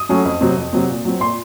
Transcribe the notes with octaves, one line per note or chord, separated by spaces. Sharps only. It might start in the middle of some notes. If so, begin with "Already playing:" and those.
Already playing: D#6
F#3 A3 C#4
F2
C3 F#3 C4
F2
C3 F#3 C4
A#2
F#3 C4
A#2 C6